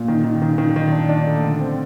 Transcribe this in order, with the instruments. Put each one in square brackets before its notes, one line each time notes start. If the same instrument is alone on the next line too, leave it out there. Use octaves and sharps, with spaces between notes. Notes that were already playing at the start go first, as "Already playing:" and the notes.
Already playing: [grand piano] A#2
D#3
D#3
D#3
D#3
D#3
D4
D4
A3
D3
C4